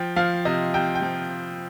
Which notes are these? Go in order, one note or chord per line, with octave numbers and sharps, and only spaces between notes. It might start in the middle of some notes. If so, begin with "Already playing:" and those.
Already playing: F3 G5
F3 F5
C3 D#5
C3 G5
G5
F3